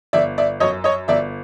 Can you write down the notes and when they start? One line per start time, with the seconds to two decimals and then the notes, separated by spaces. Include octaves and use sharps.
0.13 G1 D5 E5
0.38 D5 E5
0.60 F#2 C#5 D#5
0.84 C#5 D#5
1.08 G1 D5 E5